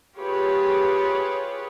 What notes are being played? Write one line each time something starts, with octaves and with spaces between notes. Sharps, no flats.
F4 G4 G#4 B4 C#5